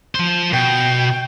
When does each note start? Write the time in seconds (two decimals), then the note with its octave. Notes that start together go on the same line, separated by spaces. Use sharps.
0.15 F3 C5
0.53 B2 G5